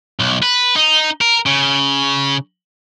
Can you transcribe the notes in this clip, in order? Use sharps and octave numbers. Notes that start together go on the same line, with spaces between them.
B1
B4
D#4
A#4
C#3